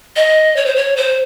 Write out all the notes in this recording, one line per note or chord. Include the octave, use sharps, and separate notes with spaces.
D#5
C#5
C5
C#5
C5